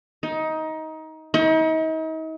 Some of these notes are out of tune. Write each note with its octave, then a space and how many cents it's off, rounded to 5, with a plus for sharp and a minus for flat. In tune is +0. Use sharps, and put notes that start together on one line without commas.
D#4 +20
D#4 +40